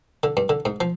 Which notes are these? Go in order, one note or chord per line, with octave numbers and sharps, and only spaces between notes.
D3
G2
D3
G#2
F3